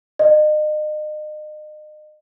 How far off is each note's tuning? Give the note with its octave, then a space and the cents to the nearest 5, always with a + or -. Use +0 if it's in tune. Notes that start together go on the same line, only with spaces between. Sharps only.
D#5 -35